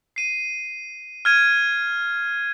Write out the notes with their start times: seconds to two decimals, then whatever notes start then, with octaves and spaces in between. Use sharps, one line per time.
0.16 C7 D#7
1.25 F6 G#6 D#7